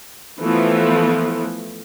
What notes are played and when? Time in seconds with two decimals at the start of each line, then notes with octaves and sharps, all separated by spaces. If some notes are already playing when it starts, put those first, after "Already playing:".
0.41 E3 F3 A3 B3